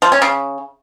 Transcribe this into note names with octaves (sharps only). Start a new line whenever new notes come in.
F3
C#4
C#3